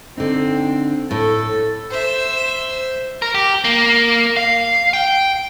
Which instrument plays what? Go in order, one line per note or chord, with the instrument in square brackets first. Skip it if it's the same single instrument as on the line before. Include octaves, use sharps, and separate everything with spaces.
[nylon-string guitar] D3 D#4 [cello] C4
[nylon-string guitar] A2 [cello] A4
[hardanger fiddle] C5 E5
[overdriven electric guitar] A#4
G4
A#3
F5
G5